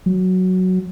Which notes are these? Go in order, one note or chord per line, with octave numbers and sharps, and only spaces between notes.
F#3